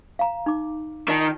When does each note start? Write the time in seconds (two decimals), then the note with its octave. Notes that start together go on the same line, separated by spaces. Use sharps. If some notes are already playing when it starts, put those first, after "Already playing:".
0.19 F5 A#5
0.46 D#4 D6
1.09 D#3 F4 D5 A5